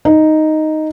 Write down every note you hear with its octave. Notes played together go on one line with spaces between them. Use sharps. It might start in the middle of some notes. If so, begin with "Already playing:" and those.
D#4